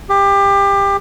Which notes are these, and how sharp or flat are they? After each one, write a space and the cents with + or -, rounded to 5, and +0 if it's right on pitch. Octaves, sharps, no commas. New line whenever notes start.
G4 +25